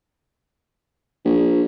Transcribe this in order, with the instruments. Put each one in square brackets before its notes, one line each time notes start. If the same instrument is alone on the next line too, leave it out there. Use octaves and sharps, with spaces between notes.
[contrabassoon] A#1